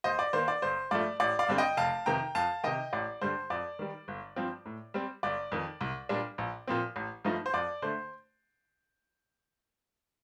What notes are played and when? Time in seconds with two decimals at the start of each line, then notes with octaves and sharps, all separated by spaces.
0.04 D#2 C5 D#5
0.19 D5
0.33 D#3 A#3 C5
0.48 D5
0.62 G1 C5
0.91 G2 F3 A3 D5
1.20 A1 D5
1.39 D5 F5
1.48 G2 D3 G3 C4
1.58 D#5 G5
1.77 F1 F5 A5
2.06 F2 C3 D#3 G5 A#5
2.35 F2 F5 A5
2.63 C3 D#3 D#5 G5
2.93 A1 D5
3.21 G2 D3 G3 C5
3.50 F2 D5
3.79 D#3 G3
4.08 G1
4.36 G2 F3 C4
4.66 A2
4.94 G3 C4
5.23 G1 D5
5.52 F2 D#3
5.81 C2
6.09 A#2 G3 D4
6.38 A#1
6.68 A#2 F3 C4
6.96 A1
7.25 G2 F3 A3 D#4
7.46 C5
7.54 F2 D5
7.82 D3 A3 C5